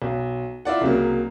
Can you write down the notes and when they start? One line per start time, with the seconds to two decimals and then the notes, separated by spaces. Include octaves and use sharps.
0.02 B1
0.65 E4 F4 D5 F#5
0.81 C2 C#3 F#3 A#3